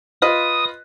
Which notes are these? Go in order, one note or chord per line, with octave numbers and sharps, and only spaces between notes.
F4 B4 D#5 D#6